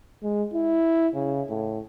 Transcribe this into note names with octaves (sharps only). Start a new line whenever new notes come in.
G#3
E4
C#3
A2